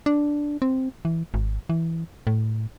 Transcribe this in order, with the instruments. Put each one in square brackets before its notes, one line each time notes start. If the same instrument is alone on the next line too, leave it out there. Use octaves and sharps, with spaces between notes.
[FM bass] D4
C4
E3
G#1
E3
A2